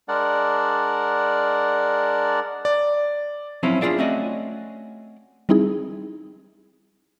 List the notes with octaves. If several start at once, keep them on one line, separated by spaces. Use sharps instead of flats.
G#3 D4 A#4 D5 F#5
D5
F3 F#3 C4 C#4 D#4 E4
D4 F4 F#4 G#4 D5 E5
A3 C4 C#4 F#4 D5 D#5
G3 C4 D#4 E4 G#4